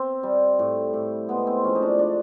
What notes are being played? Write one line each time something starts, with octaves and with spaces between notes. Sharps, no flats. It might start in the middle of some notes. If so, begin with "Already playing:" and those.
Already playing: C4
G3
A2
A2
G#3 B3
C4
F3 C#4
D#4
D4
D4